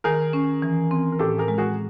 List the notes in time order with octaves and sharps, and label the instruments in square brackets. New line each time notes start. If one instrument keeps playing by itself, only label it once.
[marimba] D#3 [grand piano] G#4 A#4
[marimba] C#4
E3
C4
[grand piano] A#4
[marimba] A2 [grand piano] G4 A4
[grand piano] G#4 A#4
[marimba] G#3
[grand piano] F#4 G#4